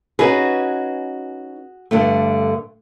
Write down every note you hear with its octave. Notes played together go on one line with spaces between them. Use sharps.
C#4 D#4 F#4 G#4 B4
G2 D3 A3